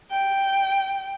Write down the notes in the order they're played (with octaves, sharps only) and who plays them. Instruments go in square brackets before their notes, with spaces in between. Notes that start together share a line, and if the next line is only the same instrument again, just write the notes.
[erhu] G5